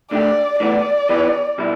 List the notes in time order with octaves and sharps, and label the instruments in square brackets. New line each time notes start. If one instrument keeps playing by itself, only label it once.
[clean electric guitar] D2 D3 A3 G4 [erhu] D5
[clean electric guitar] A2 E3 B3 [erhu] D5
[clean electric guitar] E3 B3 G4 B4
B2 G3 E4